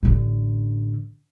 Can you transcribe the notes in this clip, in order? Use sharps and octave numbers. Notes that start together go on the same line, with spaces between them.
A1 D3